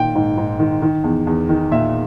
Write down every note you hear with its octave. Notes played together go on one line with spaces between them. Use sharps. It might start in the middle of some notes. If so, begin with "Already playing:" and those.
Already playing: A#2 D#3 G5
G#2
G#2
D#3
D#3
E2
E2
D#3
A#2 E5